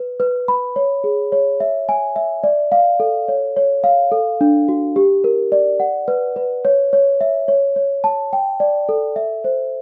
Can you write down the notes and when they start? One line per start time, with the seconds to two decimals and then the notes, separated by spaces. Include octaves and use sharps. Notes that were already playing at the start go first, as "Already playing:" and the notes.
Already playing: B4
0.20 B4
0.48 B5
0.76 C#5
1.04 G#4
1.32 C#5
1.60 E5
1.89 G#5
2.16 E5
2.44 D5
2.72 F5
3.00 A4
3.28 C#5
3.57 C#5
3.84 F5
4.12 A4
4.41 D4
4.68 F#4
4.96 G4
5.24 A#4
5.52 D5
5.80 F#5
6.08 B4
6.36 B4
6.65 C#5
6.93 C#5
7.21 E5
7.48 C#5
7.76 C#5
8.04 A5
8.33 G5
8.60 D5
8.89 A4
9.16 E5
9.44 C5